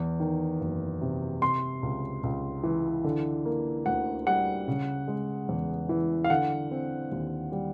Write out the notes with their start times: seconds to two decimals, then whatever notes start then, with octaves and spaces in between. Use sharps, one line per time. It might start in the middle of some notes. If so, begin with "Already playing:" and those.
Already playing: E2
0.20 D#3
0.60 F#1
1.02 C3
1.42 C3 C6
1.83 C#2
2.23 C#2
2.63 E3
3.04 D3
3.45 A#3
3.86 D2 F#5
4.27 G3 F#5
4.68 C#3
5.08 G#3
5.49 E2
5.89 E3
6.24 F5
6.30 D3 F#5
6.71 C4
7.12 D#2
7.52 G3